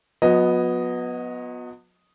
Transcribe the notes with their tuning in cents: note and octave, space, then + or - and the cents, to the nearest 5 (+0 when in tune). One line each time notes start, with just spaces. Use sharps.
F#3 -40 B3 +0 D#5 +0